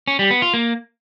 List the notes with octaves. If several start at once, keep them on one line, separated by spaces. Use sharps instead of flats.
C#4
G3
B3
F4
A#3